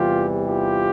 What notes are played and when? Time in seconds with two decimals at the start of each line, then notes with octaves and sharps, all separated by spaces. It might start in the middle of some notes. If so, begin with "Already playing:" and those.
Already playing: E2 C3 E3 G3 F4 G4
0.47 F4 G4